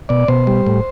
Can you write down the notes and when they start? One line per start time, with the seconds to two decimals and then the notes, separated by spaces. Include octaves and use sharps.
0.09 B2 D5
0.28 B2 C5
0.47 G3
0.66 A2